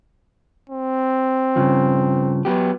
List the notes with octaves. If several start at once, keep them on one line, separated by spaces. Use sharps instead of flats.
C4
G2 C#3 F3
F#3 B3 G4